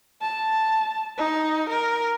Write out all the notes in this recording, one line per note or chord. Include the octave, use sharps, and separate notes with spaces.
A5
D#4
A#4